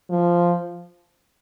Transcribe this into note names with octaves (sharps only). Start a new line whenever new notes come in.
F3